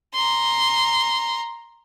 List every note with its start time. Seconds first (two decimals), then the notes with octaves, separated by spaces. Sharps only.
0.14 A#5 C6